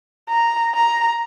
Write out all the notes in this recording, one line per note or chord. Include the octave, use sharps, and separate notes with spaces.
A#5
A#5